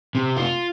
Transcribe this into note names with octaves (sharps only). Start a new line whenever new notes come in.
C3
F4